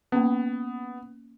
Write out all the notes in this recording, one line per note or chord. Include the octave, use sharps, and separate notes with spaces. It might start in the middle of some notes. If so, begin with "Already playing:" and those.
A#3 B3 C#4